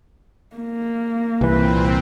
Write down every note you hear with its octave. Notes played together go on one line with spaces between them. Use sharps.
A#3
C2 A#2 E3 C4 B4